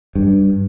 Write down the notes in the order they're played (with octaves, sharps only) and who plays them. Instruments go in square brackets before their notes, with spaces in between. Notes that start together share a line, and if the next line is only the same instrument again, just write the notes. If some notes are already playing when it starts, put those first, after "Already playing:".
[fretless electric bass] G2